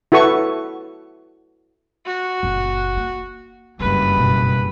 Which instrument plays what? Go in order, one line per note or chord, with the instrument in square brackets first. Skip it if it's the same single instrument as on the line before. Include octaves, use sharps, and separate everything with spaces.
[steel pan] E4 F#4 A4 B4 C#6
[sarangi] F#4
[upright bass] F#1 A#2
A#3
[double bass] F#1 G2 [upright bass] D#3 G#3 [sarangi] B4
[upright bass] B2